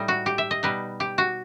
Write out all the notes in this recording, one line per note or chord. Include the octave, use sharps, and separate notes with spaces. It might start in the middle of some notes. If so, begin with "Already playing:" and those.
Already playing: A2 G3 D#4
F#4
G4
E5
D#5
B2 G3 D#4 B4
G4
F#4